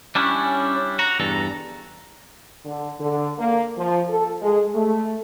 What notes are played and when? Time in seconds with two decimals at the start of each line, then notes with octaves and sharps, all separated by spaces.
0.15 G3 C#4 D4 E4
0.99 F#4 A#5
1.20 E2 G2 A4
2.65 D3
2.99 D3
3.38 A#3
3.76 F3
4.08 A4
4.41 G#3
4.75 A3